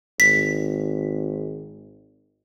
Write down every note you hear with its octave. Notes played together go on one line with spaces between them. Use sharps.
G#1 B6